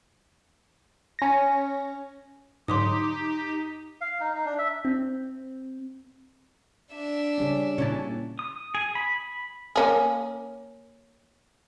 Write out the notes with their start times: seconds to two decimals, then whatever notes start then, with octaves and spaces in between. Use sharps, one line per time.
1.19 C#4 A#6
2.68 G#2 D3 F#3 D#4 G4 C6 D6 D#6
4.01 F5
4.21 D#4
4.34 D#4
4.45 D4
4.58 E5
4.85 C4
6.93 D4 E5
7.38 C#3 G3 C#4
7.78 A#2 C#3 C#4 E4 A5
8.39 D#6
8.75 G#4
8.95 B5
9.76 A#3 C#4 G#4